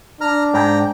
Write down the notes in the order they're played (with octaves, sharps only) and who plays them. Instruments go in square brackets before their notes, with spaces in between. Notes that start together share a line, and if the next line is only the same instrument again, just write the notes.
[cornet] D4 [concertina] A#5 F6
[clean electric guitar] G#2 [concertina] G5 A#5